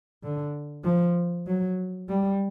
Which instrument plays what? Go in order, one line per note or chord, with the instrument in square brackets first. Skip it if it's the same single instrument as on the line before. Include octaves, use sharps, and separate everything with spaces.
[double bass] D3
F3
F#3
G3